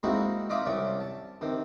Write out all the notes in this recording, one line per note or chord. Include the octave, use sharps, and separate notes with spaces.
G#3 A#3 C4 D#4 E4 F#4
D#4 F4 D5 E5 D6 D#6
C2 C3 C#4 D5
A5
C3 D#3